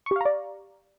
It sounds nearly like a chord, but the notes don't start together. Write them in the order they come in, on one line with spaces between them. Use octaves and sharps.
C#6 G4 F5 A#5 D5